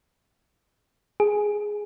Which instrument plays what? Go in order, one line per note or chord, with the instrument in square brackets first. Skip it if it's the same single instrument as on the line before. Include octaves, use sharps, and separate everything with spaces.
[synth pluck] G#4